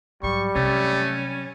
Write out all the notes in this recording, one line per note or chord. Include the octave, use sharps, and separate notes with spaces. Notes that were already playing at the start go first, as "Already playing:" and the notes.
G#2 F#3 G3 C#6
C3 F#3 A3 C#4